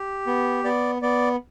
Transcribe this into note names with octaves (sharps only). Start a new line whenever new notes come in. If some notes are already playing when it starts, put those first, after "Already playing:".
Already playing: G4
B3
B3 D5
B3 D5